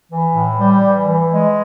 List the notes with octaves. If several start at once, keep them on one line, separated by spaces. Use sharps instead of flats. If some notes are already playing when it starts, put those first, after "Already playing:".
E3
A2
G3
E3
E3
G#3